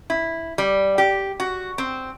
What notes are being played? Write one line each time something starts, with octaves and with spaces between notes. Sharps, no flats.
E4
G3
G4
F#4
C4